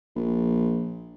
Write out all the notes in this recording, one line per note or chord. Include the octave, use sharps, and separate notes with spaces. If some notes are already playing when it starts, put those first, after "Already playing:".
A#1